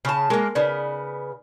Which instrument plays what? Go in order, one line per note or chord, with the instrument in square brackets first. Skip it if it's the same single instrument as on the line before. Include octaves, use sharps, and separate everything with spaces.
[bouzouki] C#3 A5 [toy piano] G#5 B5 C#6
[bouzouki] G#3 A#3 [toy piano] G#4 A#4
[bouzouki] C#3 B3 [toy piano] D#4 D5